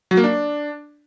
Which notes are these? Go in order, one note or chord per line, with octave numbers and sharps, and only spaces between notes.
F#3
A#3
D4